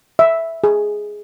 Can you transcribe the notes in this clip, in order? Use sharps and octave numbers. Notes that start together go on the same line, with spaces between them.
E5
G#4